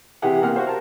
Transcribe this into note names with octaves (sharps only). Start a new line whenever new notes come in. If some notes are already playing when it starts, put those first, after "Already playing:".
C3 E3 E4 G4 G#4 F#5
C3 A#3 F#5 F6
F#4 C5 F5
A#4 A5